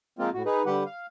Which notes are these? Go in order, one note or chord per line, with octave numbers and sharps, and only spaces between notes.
F3 G#3 A#3 C4 F4
A2 F#4
D#4 G#4 B4
D3 G3 G4 B4 F#5
F5